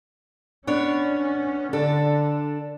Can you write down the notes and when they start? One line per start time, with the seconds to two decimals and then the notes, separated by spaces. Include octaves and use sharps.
0.67 B3 C#4 D4 C#5
1.73 D3 D4 A4